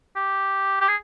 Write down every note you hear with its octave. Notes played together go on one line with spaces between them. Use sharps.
G4
G4
G#4